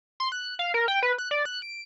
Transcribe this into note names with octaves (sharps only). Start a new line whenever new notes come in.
C6
F#6
F5
A#4
G5
B4
F#6
D5
F#6
D7